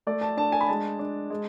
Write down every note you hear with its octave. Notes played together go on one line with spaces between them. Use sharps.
A3 D5
A5
D4 A5
G#5
B5
G#3 A5
D4
G#3